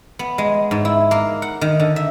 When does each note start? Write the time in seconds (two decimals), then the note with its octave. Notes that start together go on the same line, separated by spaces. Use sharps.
0.19 B3
0.38 G#3
0.71 G#2
0.85 E4
1.11 A#3
1.42 F#5
1.61 D#3
1.80 D3
1.96 E5